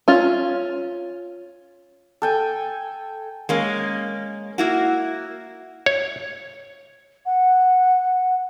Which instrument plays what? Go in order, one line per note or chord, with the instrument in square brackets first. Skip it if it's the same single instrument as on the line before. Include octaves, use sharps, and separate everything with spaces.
[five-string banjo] C#4 F4
[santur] A4 G5 G#5
[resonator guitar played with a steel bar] G#3 A#3 C#4
A#3 E4 F#4
[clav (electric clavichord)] C#5
[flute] F#5